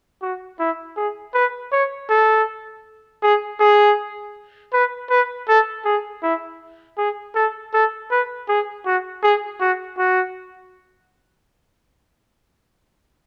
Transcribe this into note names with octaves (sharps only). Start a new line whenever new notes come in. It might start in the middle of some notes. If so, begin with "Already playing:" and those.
F#4
E4
G#4
B4
C#5
A4
G#4
G#4
B4
B4
A4
G#4
E4
G#4
A4
A4
B4
G#4
F#4
G#4
F#4
F#4